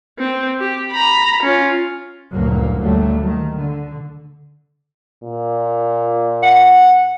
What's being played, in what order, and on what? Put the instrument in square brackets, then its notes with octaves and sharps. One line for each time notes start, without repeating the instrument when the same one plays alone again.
[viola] C4
G4
A#5 B5
C#4 F4
[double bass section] F#1 D2 G2 A#2 F#3 A#3
D2 F#3 G3 A3 A#3
D#3
D3
[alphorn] A#2
[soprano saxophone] F#5